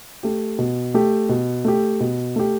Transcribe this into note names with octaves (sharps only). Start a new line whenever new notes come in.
A3 G4
B2
A3 G4
B2
A3 G4
B2
A3 G4